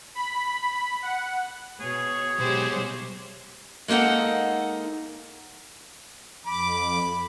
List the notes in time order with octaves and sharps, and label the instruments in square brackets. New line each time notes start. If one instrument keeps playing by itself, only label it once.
[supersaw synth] B5
F#5
[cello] B2 [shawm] G#4 [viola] C#5
[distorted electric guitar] B1 B2 [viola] G#3 G4 [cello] C5 C#5
[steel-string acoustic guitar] G#3 A#3 D#4 A4 F#5
[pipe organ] F2 D6 [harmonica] B5